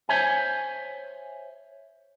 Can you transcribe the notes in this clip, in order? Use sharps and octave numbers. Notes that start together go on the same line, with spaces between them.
C5 C#5 E5 G#5